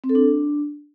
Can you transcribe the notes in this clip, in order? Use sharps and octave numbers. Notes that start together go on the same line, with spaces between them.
C4
A4
D4